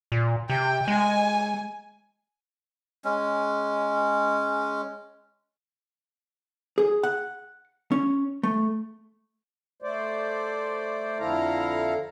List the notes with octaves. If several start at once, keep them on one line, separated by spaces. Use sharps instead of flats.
A#2
C3 G5
G#3 G#5
G#3 C#4
G#4
F#5
C#4
A3
A3 C5 D5
F2 D3 E4 A4 F5 A#5